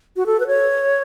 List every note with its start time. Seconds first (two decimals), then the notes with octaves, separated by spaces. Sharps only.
0.16 F#4
0.26 A4
0.40 B4
0.47 C#5